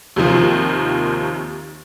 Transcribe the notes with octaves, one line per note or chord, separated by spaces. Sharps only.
D#2 C3 D#3 F3